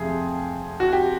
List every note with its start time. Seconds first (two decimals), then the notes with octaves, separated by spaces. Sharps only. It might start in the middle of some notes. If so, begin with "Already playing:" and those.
Already playing: F2 C3 F3 A3 G#4
0.80 F#4
0.93 G4